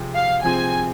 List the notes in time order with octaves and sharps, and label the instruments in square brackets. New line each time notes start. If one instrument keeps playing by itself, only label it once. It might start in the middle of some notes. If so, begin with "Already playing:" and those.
Already playing: [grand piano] C3 F3 C4 G#4 C5
[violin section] F5
[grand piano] C3 F3 C4 G#4 C5 [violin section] G#5